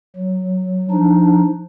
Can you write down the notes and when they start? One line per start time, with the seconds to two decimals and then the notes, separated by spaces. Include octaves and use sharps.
0.16 F#3
0.91 F3 D4 D#4